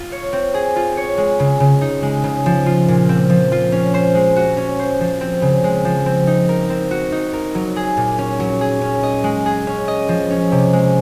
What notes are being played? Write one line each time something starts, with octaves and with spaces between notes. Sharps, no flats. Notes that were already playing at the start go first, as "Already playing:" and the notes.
Already playing: F4
C#5
C4
G#4
F4
C#5
G#3
C#3
C#3
D#4
G#3
C#3
F3
F4
A#2
C4
F3
F4
C#4
C5
G#3
F#4
C#4
C5
F3
C4
C#3
G#3
F3
C4
D#4
A#4
C4
F#4
D#4
A#4
F#3
G#4
A#2
C#4
F#3
G#4
C#4
D#5
G#3
G#4
C#4
D#5
F3
C#4
C3
G#3